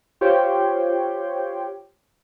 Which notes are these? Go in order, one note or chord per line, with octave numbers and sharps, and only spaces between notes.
F4 G4 C5 C#5 G5